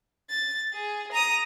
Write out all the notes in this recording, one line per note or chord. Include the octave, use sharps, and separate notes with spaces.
A6
G#4
A#5 D#6